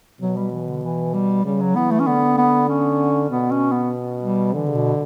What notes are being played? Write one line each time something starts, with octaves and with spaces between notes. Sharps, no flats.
B2 F#3
G3
E3
D3
E3
G3
C#3 G3
F#3
E3 B3
A3
C#4
D3 B3
B3
C#4
B2 B3
C#4
B3
G3
D3 E3
C#3
B2